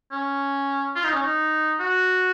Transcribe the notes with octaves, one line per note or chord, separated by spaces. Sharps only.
C#4
F4
D#4
C#4
D#4
F#4